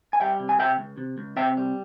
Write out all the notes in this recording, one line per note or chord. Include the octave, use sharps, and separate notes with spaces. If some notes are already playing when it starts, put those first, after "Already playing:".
G#5
G3 E5 G5
C3
G#5
C3 E5 G5
C#2
C3
C#2
C3 E5 G5
G3